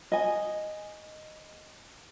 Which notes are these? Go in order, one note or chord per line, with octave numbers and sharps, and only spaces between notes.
D#5 G#5